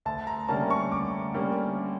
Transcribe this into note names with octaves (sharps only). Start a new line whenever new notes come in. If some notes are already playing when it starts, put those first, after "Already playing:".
D2 A5
A#5
D3 G3 A#3 C#4 A5
C#6
D2 D6
D3 G3 A#3 C#4